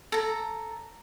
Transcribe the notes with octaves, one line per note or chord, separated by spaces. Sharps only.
A4 A#5